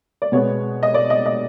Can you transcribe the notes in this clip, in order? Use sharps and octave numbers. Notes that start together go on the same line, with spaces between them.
D5
B2 G#3 B3 C#5
D#5
D5
D#5
D#5